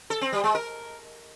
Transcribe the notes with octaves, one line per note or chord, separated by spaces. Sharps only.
A4
C4
G3
G#3
A#4